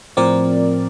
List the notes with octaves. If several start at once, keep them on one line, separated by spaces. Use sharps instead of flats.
A2 F3 C4 A#4 D5